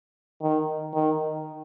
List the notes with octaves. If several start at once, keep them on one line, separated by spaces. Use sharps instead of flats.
D#3
D#3